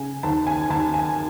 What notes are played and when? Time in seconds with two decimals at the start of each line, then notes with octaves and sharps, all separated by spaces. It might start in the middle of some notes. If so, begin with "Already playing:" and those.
Already playing: C#3 G#5
0.23 D#2 A5
0.47 G#5
0.70 D#2 A5
0.94 G#5